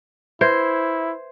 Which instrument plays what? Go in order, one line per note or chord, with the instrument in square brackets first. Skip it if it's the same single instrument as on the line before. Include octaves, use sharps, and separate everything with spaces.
[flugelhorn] E4 [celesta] B4 E5 G#6 [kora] C5